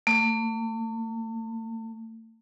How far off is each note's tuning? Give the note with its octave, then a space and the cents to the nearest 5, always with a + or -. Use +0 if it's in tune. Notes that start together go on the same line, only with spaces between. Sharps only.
A3 +40